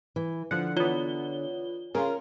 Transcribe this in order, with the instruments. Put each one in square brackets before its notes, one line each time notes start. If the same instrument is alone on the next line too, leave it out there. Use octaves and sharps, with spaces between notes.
[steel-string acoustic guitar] E3
[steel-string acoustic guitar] D3 [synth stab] F3 F#5
[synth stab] E3 B3 [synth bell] F4 C#5 G7
[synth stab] C#3 F4 [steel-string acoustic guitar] C#4 A#4